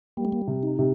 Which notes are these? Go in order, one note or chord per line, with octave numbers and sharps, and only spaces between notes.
G3 A#3
A3
A#3
C3
D#4
C3